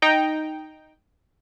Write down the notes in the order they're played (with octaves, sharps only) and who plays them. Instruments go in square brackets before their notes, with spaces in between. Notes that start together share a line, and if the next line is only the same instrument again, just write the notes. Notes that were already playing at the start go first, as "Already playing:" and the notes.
[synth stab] D#4 G5 A#5